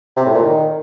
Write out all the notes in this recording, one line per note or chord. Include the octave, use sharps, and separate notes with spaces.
C3
A2
A#2
D#3